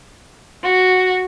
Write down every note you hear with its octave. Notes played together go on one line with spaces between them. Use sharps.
F#4